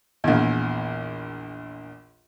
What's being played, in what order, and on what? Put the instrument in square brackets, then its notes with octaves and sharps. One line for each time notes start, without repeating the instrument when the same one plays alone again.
[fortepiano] A#1 E2